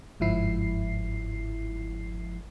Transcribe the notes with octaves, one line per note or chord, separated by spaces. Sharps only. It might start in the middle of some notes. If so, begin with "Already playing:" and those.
G1 G#2 F3 E4 C7